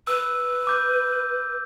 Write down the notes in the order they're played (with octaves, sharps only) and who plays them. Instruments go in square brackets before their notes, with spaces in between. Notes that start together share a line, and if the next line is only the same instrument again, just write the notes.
[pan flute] B4 [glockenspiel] E6
[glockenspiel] D6 G6